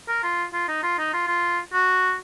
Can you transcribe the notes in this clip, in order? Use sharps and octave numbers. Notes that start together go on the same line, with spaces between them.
A#4
F4
F4
D#4
F4
D#4
F4
F4
F#4